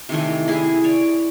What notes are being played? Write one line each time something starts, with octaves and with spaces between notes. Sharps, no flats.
C3 D#3 E3 A3
E4 G#4
C#5 D5